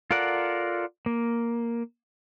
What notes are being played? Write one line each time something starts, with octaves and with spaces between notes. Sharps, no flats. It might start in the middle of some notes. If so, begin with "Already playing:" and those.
F4 A4 A#4 D5 F#5
A#3